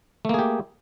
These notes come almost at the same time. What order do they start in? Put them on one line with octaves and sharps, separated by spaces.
A3 A#3 G#4 G4